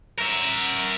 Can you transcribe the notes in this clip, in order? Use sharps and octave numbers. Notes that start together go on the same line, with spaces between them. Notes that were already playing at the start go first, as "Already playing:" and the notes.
A#4 E5